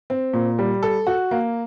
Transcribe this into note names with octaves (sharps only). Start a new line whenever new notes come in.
C4
A#2
G3
A4
F#4
A#3